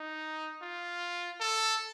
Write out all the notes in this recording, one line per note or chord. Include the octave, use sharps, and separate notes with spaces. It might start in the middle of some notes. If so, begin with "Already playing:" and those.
Already playing: D#4
F4
A4